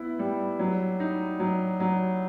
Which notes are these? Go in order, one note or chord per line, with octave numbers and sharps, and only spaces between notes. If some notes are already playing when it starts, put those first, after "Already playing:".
Already playing: B3 E4
G3
F#3
D#4
F#3
F#3